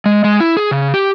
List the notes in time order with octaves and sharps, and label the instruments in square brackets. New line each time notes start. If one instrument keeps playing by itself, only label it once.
[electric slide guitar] G#3
G#3
E4
G#4
C#3
G4